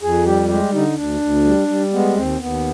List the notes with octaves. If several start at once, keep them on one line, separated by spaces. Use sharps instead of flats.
F2 G#4
G3 G4
G#3 G4
D3 D#4
D2 D4
D2
G3
G3
G#3 B3
D#2 C4
D#2 B3